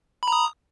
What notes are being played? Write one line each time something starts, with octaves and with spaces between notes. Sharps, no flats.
A#5 B5 D#6